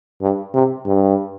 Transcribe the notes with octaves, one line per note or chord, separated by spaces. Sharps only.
G2
C3
G2